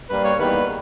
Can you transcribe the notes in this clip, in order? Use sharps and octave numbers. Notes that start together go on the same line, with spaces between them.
G2 G3 A#3 B4
C#5
E2 D#3 G3 A#3 B4